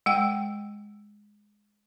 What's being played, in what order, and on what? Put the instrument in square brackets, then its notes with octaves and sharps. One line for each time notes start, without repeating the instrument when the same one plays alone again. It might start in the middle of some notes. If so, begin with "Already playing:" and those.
[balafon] G#3 F#5 G5